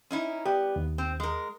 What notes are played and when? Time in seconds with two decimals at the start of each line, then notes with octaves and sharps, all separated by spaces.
0.11 C#4 D#4 E4
0.45 B3 G4 D5
0.76 D#2
0.98 C4
1.20 G#3 A#4